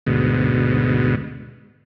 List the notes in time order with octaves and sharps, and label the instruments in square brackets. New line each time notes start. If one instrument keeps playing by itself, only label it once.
[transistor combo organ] D2 G#2 B2